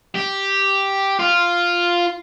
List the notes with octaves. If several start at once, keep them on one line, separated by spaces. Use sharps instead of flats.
G4
F4